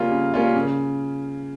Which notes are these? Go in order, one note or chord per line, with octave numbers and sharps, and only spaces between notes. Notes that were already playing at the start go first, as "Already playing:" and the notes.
Already playing: C#3 G3 A#3 C#4 F4
C#3
G3 A#3 C#4 F4
C#3